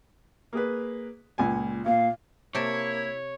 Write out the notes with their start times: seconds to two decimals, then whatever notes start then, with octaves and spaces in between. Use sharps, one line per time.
0.53 A#3 G#4 B4
1.38 C#2 A#2 G#5
1.86 A#2 F5
2.55 C3 A#3 E4 C#5 D5 A5